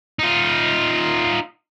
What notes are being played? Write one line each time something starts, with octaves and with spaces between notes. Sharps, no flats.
D#4 F4